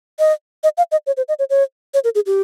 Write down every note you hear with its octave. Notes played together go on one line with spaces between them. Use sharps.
D#5
D#5
F5
D#5
C#5
C5
D#5
C#5
C#5
C#5
A#4
G#4
G4